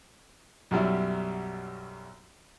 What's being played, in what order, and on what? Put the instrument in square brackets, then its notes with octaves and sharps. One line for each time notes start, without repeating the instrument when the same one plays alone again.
[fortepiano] B1 F#2 G3 E4